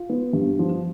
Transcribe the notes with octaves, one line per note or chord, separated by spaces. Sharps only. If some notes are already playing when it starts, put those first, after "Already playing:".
Already playing: F4
B3
G2
F3